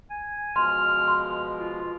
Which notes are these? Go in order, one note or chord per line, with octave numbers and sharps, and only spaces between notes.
G#5
B2 F3 G#3 C6 F6
C6
F4